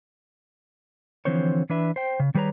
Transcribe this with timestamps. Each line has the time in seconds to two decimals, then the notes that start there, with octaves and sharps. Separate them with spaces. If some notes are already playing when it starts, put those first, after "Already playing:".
1.25 D3 E3 F3 C4 C5 C#5
1.70 E3 D4 B4 E5
1.96 C5 G5
2.20 C#3
2.35 D#3 G3 G#4 B4 C#5 A#5